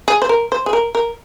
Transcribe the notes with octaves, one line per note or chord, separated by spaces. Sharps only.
G#4
C5
A#4
C5
G#4
A#4
A#4